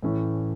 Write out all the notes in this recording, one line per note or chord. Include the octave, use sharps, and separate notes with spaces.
A2 E3 A3 C#4 E4